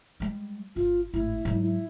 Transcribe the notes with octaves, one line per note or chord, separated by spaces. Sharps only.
G3 G#3
G1 F4
G#1 A2 E4
G#2 F#3
E4